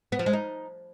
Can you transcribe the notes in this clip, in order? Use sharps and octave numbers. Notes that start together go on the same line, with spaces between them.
B3
F3
G#3
D#4